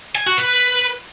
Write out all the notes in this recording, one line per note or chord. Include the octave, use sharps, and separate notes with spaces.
G#5
F#4
B4